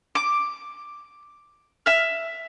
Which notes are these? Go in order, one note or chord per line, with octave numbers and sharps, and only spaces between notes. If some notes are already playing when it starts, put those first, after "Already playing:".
D6
E5 F6